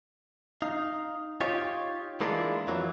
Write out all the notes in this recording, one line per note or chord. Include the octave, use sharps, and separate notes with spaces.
D#4 F5
D#4 F4 G4 C#5
E3 G#3 A#3 D4 E4 F4
F2 E3 F#3 A#3